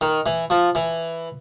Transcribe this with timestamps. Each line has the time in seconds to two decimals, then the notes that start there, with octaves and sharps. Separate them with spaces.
0.01 D#3
0.26 E3
0.50 F3
0.75 E3